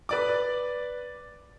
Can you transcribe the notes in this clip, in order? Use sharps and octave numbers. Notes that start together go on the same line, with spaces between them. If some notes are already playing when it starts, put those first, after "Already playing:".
B4 D5 D6